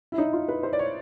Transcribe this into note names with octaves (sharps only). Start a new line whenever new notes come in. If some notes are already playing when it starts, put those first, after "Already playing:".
E4
D#4
F4
B4
C5
D5
C#5